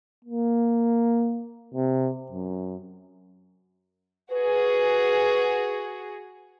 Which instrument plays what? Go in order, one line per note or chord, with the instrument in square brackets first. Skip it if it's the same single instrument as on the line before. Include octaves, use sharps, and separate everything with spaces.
[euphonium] A#3
C3
F#2
[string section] F#4 G#4 [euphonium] B4